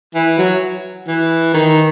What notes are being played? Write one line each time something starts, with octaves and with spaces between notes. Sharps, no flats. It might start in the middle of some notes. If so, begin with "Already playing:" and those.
E3
F#3
E3
D#3